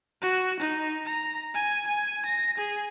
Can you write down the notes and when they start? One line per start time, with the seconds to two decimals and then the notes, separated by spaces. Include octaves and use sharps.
0.22 F#4
0.60 D#4
1.06 A#5
1.55 G#5
1.88 G#5
2.26 A#6
2.58 G#4